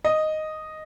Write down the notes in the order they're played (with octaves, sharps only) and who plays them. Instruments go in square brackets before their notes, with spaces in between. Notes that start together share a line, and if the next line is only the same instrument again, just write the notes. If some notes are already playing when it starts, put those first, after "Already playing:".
[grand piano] D#5